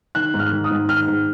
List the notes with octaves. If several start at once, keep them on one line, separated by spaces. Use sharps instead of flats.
D#3 F#6
G#2
F6
D#3
D#6
G#2
D#3 F6
G#2